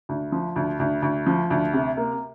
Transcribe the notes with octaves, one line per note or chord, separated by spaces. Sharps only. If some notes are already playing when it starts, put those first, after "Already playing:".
D2
F3
D2
D2
D2
F3
D2
C3
A#3